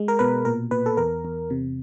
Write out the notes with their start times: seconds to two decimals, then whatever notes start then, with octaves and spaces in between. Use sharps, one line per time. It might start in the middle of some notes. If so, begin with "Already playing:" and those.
Already playing: G#3
0.08 A#4
0.19 B2 B4
0.45 A#2 A#4
0.71 A#2 B4
0.86 A4
0.97 E2 A#4
1.25 E2
1.50 C3